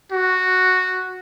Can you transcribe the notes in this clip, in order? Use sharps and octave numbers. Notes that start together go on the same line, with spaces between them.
F#4